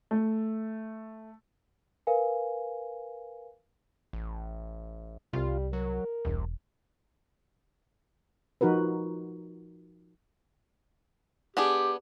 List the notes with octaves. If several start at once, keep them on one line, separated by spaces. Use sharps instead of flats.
A3
A#4 B4 F5 G#5
A1
C2 G3 F4
F#3 A#4
E1 C2
F3 D#4 F#4 A#4 B4
B3 D4 G4 G#4